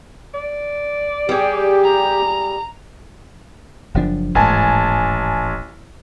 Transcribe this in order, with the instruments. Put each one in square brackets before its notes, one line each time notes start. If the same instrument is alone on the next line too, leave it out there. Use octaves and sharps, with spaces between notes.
[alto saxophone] D5
[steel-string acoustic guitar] G3 G#4 [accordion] G4
[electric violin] A#5
[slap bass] F#1 F3 D4
[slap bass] D#1 G#2 [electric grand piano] A1 G#5 A5